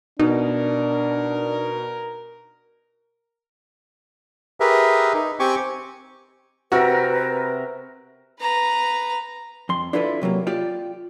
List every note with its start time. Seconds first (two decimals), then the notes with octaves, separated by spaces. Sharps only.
0.19 B2 D4 D#4 A#4
4.60 G4 G#4 A#4 B4 E5
5.14 D#4
5.40 C4 G4 G#5 C#6 D6
6.72 C3 F#4 A#4 B4 E5
8.40 B4 A#5
9.69 F2 C6
9.93 D4 E4 F4 A4 B4
10.22 C3 F#3 G#3 A#3
10.47 F4 G4 D5